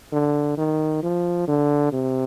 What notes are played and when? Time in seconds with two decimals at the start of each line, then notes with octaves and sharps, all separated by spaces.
0.12 D3
0.58 D#3
1.03 F3
1.47 D3
1.92 C3